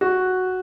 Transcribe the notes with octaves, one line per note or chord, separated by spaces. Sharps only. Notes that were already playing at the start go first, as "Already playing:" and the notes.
F#4